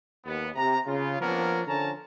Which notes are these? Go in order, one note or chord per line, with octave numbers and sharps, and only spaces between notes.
D#2 B3
C3 A#5
C#3 F4
F3 A#3 B3 C#4 D4 A#4
D3 F3 C#4 A5 A#5